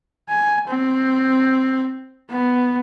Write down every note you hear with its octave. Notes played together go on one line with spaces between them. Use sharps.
G#5
C4
B3